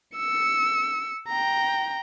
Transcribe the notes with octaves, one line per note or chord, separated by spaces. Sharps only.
E6 C#7
G5 A#5